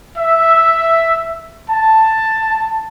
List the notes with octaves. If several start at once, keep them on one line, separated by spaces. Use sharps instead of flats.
E5
A5